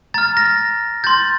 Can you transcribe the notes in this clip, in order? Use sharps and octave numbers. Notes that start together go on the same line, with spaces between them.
A#5 F6 A6
A#6
C6 G6 A6